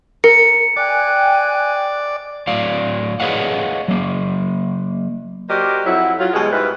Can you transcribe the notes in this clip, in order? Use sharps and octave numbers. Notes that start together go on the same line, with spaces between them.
A#4 C#7
D5 G5 G#5 F#6
A2 F#3 D5 F5
G#4 B4 C#5 D#5 F5 F#5
F#3 A#3
F#4 G4 A#4 C5 D5 D#5
F2 F#3 E4
F#3 F4
B2 E3 G3 G#3
G#2 B2 G3 A#4 B4 E5